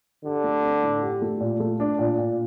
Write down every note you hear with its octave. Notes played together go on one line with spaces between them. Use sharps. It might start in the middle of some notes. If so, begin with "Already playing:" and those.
D3 G4
A3
C4
A2
G4
A3
A#2
A3
D4
A#2
A#2